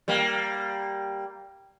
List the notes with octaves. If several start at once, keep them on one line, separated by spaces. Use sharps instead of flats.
G3 A#3